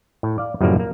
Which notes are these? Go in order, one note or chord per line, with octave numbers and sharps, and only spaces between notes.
A2
D5 F5
F#2 A2 C#3 F3 G3 A#3
A#3